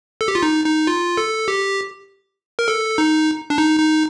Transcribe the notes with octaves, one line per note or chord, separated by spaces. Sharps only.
A4
G4
F4
D#4
D#4
F4
A4
G4
A#4
A4
D#4
D4
D#4
D#4